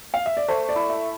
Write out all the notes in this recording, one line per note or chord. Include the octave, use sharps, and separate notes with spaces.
F5
E5
D5
A3 C5
D5
E4
E5